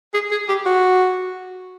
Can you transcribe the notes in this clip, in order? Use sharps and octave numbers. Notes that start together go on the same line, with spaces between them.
G#4
G#4
G4
F#4